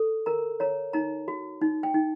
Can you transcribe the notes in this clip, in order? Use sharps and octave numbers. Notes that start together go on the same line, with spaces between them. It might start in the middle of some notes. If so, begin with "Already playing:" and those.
Already playing: A4
A#4 A#5
C#5 A#5
D#4 A#5
F#4
D#4
G5
D#4